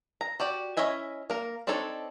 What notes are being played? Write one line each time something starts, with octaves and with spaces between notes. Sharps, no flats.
A#5
F#4 G4 D5
C#4 E4 D#5 E5 G#5
A#3 A#4
C4 D4 D#4 A4 C#5